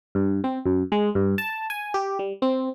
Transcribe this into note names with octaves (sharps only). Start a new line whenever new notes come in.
G2
C4
F#2
G#3
G2
A5
G#5
G4
G3
C4